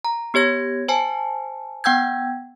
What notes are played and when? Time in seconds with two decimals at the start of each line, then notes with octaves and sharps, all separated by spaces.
0.05 A#5
0.34 B3 G4 C#5 G#6 A#6
0.88 C5 G#5 A5
1.84 B3 F#5 G5 E6 G6 G#6